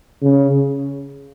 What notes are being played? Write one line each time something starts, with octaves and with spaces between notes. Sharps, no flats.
C#3